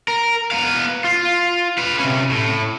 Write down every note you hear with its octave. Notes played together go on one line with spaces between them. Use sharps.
A#4
B3 F5
F4
B4 F5
C3 C#4
A2